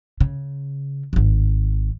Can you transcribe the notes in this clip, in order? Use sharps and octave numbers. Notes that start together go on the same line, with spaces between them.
C#3
D1 G#1